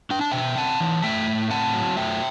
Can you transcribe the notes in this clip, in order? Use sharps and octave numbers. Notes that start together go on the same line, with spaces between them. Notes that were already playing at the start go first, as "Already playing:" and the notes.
D4 G5
A5
B2 E5 G5
C4 F#5 A5
E3
A3 E5 G5
A2
C4 F#5 A5
F#3
A3 E5 G5